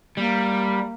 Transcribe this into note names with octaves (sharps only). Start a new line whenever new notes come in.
G3 A#3